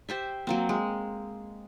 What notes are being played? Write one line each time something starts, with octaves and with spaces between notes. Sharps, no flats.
G4 C5 E5
F#3 A#3 C4
G#3